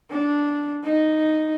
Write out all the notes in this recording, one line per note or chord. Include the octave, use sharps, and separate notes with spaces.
D4
D#4